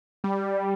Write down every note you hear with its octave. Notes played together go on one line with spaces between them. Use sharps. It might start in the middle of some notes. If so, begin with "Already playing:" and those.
G3